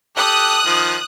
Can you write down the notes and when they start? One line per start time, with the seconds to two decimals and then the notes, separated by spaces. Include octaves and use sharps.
0.17 G4 A4 D#6 F#6
0.66 D#3 F3